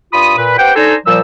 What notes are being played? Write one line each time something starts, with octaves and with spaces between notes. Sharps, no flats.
G2 F4 B5 D#6
A#2 B4
G4 B4 C5 F#5 G5
D4 D#4 A4 C5 G#5 A#5
A#2 F3 G3 E6